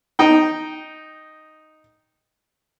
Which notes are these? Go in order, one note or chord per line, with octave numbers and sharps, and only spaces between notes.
D#4 G5